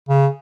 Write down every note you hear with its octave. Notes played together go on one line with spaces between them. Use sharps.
C#3